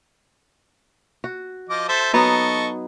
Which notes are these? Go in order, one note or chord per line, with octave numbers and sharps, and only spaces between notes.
F#4
F3 D#5 D6
A4 C5 E5
F#3 B3 D#4 A4 D#5 C#6